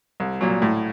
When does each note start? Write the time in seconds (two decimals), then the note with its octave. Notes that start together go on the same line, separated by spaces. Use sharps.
0.20 C2
0.41 A#2 F#3
0.62 A2